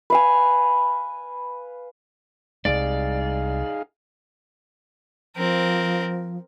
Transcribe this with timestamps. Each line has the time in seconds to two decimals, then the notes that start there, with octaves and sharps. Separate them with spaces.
0.10 B4 F5 G#5
2.65 C2 G3 G#3 D#4 G#4 D5 F5
5.36 F3 C4 A#4